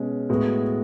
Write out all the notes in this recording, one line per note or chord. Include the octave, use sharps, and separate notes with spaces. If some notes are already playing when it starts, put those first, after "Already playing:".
Already playing: B2 G#3 C#4
A2 G#3 B3 F#4